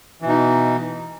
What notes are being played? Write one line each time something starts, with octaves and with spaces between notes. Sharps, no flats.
B2 E3 D#4